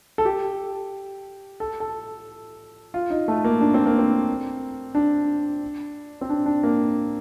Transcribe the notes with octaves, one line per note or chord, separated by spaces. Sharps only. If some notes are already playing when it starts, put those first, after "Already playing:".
A4
G4
A4
A4
F4
D#4
A3
A#3
D4
C4
A#3
C4
D4
C4
D4
D4
A#3